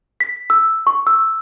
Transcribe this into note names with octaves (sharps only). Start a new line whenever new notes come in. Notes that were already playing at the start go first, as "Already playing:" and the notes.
B6
E6
C#6
E6